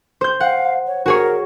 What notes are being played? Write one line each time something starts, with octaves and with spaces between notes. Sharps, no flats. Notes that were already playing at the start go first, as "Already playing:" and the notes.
C5 G6
F5 F#5
C#5
F#4 G#4 A#4 C#5